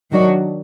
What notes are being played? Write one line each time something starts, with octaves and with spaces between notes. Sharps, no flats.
D#3 F#3 D4 F#4